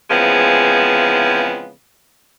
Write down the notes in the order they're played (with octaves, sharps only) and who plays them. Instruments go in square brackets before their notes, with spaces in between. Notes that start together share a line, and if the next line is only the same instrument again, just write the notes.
[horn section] C#3 E3 F3 G#3 B3 C4